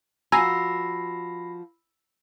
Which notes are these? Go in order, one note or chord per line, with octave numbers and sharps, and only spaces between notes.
F3 F#4 G#5 A#5 B5 E6 A#6 C7